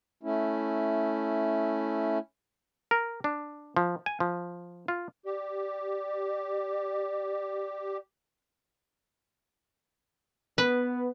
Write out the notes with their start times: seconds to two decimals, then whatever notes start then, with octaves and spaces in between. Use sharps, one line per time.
0.23 A3 C#4 E4
2.91 A#4
3.24 D4
3.76 F3
4.06 G#5
4.20 F3
4.88 F4
5.26 G4 D5
10.58 B3 B4